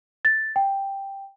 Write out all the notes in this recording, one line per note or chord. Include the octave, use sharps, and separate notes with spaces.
A6
G5